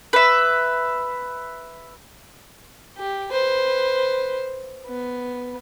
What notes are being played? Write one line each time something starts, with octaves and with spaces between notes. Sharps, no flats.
B4 E5
G4
B4 C5
B3